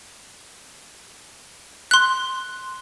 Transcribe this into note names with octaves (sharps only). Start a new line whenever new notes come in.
C6 F#6